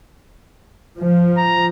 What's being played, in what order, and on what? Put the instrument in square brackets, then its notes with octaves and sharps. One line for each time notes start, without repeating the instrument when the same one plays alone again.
[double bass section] F3
[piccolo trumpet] A#5